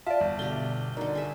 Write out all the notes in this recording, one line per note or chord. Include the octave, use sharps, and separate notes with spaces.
F4 D5 E5 A5
G1
B2 D3 D4 G4 G7
D3 D#4 F#4 A#4 D5
G#4 E5